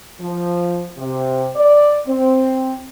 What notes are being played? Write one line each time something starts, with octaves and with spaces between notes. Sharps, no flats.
F3
C3
D5
C4